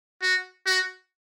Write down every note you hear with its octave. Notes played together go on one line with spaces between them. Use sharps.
F#4
F#4